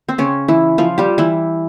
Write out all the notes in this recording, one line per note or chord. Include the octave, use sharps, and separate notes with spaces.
C4
C#3 C#4
E3 E4
F3 F4
G3 G4
E3 E4